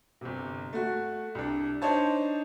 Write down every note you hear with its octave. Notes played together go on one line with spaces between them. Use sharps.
G1 C3
A3 F#4
C2 D4
D4 D#4 C5 C#5 A5